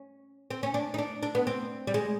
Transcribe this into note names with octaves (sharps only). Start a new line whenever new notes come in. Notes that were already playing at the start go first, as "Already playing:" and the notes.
Already playing: C#4
C4
C#4
D4
D#4
D4
D4
B3
C4
G3
G#3